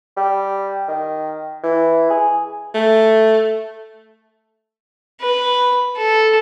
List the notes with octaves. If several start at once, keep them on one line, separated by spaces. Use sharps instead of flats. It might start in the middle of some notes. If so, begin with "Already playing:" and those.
G3
D#3
E3
G#4
A3
B4
A4